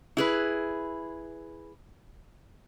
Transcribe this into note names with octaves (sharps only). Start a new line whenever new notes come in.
E4 G#4 B4